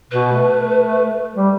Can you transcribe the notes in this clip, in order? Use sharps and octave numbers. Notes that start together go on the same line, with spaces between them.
B2 B4
A3
G3